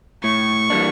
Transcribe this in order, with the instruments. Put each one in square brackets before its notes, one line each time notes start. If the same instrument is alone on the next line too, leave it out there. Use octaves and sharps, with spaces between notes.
[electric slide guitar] A2 [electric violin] C#6
[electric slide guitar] E3 G3 A#3 D4